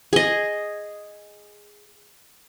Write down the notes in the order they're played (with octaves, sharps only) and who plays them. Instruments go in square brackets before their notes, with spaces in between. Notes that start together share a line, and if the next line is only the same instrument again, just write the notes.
[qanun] G#4 D#5